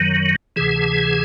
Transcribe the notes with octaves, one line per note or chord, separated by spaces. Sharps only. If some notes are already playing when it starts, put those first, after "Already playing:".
Already playing: F#2 D#3 F#3
D2 C3 E3 G#4